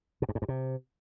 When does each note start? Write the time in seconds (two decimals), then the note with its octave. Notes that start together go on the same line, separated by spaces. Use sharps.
0.22 B2
0.29 G2
0.35 G#2
0.42 G2
0.48 C3